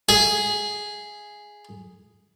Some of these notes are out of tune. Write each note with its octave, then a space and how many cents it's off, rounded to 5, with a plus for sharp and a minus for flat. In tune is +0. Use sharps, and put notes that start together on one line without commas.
G#4 +0 E5 +20